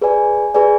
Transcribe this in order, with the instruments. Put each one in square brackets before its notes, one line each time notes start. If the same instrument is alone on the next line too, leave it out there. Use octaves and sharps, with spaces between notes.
[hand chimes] G#4 B4 D5 G#5
G#4 B4 D5 G#5